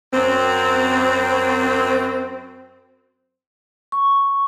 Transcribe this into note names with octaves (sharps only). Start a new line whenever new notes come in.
F#2 C4
C#6